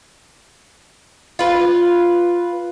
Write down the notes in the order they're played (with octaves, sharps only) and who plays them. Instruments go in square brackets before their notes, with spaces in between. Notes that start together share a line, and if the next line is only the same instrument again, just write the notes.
[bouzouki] F4 B4